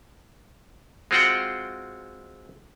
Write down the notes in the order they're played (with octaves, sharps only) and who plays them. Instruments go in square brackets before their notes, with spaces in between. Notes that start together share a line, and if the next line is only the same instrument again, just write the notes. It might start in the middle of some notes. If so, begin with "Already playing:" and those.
[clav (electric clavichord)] G#3 C4 F4 F#4 F#5 G5